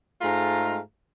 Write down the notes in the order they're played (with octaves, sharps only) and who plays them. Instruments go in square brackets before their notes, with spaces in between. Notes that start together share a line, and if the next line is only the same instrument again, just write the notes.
[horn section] G#2 G#3 A3 F4 F5 A#5